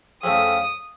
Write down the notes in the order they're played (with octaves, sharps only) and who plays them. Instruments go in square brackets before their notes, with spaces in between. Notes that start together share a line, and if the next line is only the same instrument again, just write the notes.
[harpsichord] F2 C#3 A3 [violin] D#6